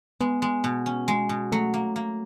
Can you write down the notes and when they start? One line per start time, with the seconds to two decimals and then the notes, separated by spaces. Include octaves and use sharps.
0.20 G#3 B3
0.42 G#3
0.64 B2
0.86 C#4
1.08 G#3
1.29 B2
1.52 F#3 A3
1.74 A#3
1.96 A#3